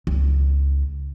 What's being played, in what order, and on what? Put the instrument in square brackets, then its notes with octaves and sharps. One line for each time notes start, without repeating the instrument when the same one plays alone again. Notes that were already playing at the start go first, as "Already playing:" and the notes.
[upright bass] C#2